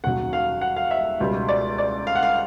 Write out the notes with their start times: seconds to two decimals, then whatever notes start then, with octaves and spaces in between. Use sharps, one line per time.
0.04 D#2 C#3 F#3 F#5
0.33 F5
0.61 F#5
0.76 F5
0.91 E5
1.20 C#2 B2 G3
1.48 D5
1.78 D5
2.07 F5
2.16 F#5
2.23 F5